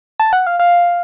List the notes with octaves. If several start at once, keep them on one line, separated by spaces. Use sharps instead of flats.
A5
F#5
F5
F5